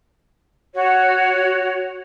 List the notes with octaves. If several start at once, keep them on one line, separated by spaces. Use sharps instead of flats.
F#4 C#5